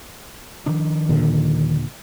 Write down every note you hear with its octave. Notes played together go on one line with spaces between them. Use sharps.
D#3 F3 D4
D#2 A#2 D3